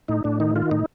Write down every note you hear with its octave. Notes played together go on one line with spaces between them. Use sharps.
A2 D#4
A2 D4
D#3 D#4
D#3 F4
A2 D#4